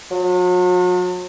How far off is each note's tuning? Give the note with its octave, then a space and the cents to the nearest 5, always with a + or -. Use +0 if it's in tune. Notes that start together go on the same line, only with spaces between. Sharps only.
F#3 -40